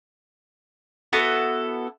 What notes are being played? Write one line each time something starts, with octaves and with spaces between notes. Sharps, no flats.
B3 E4 F#4 A4